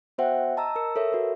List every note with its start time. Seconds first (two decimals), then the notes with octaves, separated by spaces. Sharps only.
0.18 B3 F#4 C5 E5 F#5 G5
0.57 D#5 A5 A#5 E6
0.76 A#4 E6 C#7
0.96 A4 A#4 C#5 E5
1.12 F#4 B4